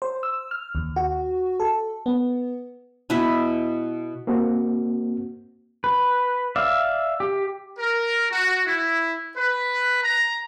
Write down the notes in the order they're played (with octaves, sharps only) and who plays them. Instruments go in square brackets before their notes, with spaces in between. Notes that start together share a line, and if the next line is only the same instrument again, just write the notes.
[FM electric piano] C5
E6
F6
D#2
F#4
A4
B3
[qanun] B2 E4 B4 E5
[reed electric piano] A#3 C4 F#4
[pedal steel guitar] B4
D5 E5 F5
G4
[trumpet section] A#4
F#4
E4
B4
A#5